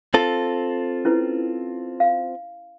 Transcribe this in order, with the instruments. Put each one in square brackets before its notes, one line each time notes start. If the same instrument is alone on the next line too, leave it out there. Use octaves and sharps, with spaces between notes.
[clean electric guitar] C4 F4 A4
[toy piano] C#4 E4 B4
F5